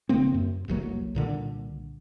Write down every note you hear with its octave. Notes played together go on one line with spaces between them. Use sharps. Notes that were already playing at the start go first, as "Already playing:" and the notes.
E1 C#3 A#3 C4
F#2
F1 C2 F#3 A#3
C2 A#2 D3